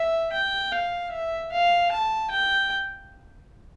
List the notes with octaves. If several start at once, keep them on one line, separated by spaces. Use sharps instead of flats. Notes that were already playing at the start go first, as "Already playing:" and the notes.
Already playing: E5
G5
F5
E5
F5
A5
G5